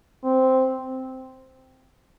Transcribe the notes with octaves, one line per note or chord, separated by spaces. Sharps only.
C4